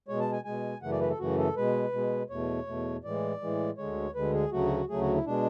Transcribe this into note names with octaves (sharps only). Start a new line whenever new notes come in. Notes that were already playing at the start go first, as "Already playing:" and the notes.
B2 G#3 C#5
A5
G#5
B2 G#3 G#5
F#2 C#3 E3 A3 F#5
D5
B4
A4
F#2 C#3 E3 A3 F#4
A4
B2 G#3 B4
B2 G#3
E2 B2 A3 C#5
E2 B2 A3
A2 E3 G#3 D5
A2 E3 G#3
D2 D3 G#3 C#5
D2 D3 G#3 B4
G#4
D2 C#3 F#3 A3 F#4
D2 C#3 F#3 A3 G#4
F#4
E4
B2 G#3 D4